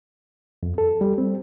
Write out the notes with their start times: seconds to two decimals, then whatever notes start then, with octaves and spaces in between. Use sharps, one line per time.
0.63 F2
0.78 A4
1.01 G3
1.18 C4